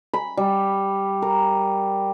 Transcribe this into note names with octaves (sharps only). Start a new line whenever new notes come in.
B5
G3
A#4